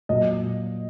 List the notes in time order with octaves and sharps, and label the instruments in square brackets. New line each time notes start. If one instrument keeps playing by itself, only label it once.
[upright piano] A#2 F#3 D#5